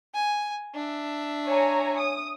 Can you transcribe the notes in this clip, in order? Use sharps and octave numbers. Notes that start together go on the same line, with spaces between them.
G#5
D4 E5
C#5 G#5 A#5
D#6